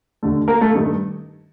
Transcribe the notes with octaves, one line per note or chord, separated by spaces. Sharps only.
D#2 D3 A3
A#3 A#4
A3 A4
G2 D#3 A3